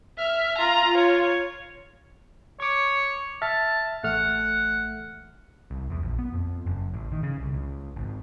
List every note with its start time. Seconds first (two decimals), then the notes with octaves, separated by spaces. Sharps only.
0.18 E5 F6
0.58 F4 A#5
0.97 C#5
2.60 C#5 C#6 D6
3.42 E5 A5 F6 A6
4.04 A1 A3 F#5 F6
5.71 C2
5.90 E2
6.03 A#1
6.19 B3
6.34 F2
6.66 F#1
6.94 A1
7.12 D#3
7.23 C#3
7.38 C2
7.53 C#2
7.96 G#1